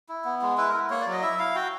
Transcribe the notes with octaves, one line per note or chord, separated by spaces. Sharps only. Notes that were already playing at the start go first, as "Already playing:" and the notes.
E4
B3
G#3
E4 B4
A#4
E4
A#3 C#5
D5
F#3
D#5
E4 E5
E4 F5
F#4 G5